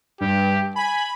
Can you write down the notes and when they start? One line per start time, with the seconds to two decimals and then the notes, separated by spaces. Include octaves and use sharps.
0.21 G2 G4
0.76 G#5 B5